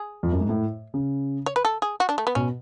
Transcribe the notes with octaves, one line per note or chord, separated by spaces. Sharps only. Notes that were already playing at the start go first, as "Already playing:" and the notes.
Already playing: G#4
F2
F#2
G#2
A2
C#3
C#5
B4
A4
G#4
F#4
D4
A3
B3
B2 C#4